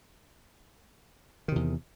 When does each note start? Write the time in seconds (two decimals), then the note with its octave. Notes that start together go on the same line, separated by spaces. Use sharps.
1.48 D#3
1.52 C3
1.56 E2